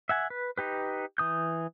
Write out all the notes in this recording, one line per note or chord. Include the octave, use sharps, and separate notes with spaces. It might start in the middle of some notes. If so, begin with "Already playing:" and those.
E5 F#5 G#5
B4
D#4 G4 B4
E3 D#6 G6